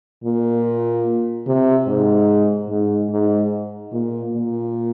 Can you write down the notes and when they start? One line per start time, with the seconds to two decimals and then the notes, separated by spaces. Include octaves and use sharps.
0.24 A#2
1.47 C3
1.87 G#2
2.69 G#2
3.10 G#2
3.92 A#2
4.33 A#2